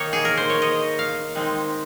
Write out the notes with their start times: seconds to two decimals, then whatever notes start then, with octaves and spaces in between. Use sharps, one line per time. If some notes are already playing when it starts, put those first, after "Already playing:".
Already playing: D#3 A#3 D#4 C#5
0.13 G#4
0.25 A#4
0.37 C5
0.50 C#5
0.62 D#5
0.99 F5
1.35 D#3 G#3 C4 D#4